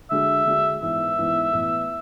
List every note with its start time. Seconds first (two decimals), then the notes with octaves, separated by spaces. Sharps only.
0.10 D3 G#3 D4 F#4 E5
0.46 D3 G#3 D4 F#4
0.82 G#2 E3 B3 E4 E5
1.17 G#2 E3 B3 E4
1.53 A2 E3 B3